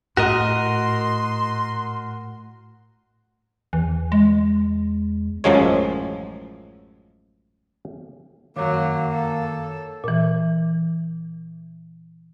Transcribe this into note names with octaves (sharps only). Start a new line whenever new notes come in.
A2 F#4 A#4 D#5 C6
E2 E3
G#3
A1 F#2 F3 F#3 G#3 C#5
F#2 D#3 F#3 A#3 C#5 F5 D6
A4
A#2 E3